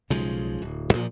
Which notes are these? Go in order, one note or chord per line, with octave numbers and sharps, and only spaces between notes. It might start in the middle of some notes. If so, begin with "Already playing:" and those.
B1 C#3 F3 G#3
D1
A#1 A#2 F3